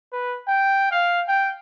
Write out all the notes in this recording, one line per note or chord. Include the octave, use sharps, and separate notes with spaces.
B4
G5
F5
G5